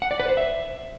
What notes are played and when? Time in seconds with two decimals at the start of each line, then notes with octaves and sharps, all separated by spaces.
0.02 F#5
0.11 D5
0.20 B4
0.28 C5
0.37 E5